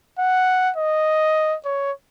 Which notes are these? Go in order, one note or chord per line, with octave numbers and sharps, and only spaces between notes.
F#5
D#5
C#5